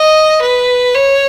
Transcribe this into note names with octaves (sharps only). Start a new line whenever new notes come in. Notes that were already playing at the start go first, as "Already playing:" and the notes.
Already playing: D#5
B4
C#5